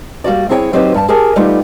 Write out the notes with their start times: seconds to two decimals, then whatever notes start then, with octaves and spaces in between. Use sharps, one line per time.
0.24 G3 A#3 F#4 D5
0.49 C4 E4 G#4 A4 C#5 G5
0.73 F#3 C4 D#4 G4 B4 C5
0.94 G2 A4 A5
1.08 G4 G#4 A#4 G#5 A5
1.36 G3 A3 B3 D#4 F4 G4